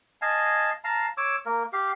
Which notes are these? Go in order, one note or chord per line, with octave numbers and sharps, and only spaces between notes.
D#5 F5 G#5 A5
F5 A5 A#5
C#5 D6 E6
A#3 A#4
G4 F5